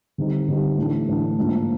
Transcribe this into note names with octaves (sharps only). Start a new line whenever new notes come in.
D3 G3 C4 D#4
D3 G3 C4 D#4
A2 E3 A3 D4
A2 E3 A3 D4
G#2 F3 A#3 D4